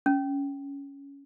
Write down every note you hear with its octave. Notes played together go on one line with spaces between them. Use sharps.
C#4